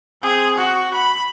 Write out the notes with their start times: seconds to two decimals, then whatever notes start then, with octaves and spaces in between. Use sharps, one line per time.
0.22 C4 G#4
0.58 F#4
0.94 B5